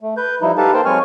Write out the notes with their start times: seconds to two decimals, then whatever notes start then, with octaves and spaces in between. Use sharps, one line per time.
0.01 A3
0.17 B4 G6
0.42 F3 G3 D#4 E4
0.58 D#4 G4 A4 B4 F5 A5
0.74 A#3 A#4 C5 G5 A5
0.85 F#3 G#3 C4 G#5 C#6 F6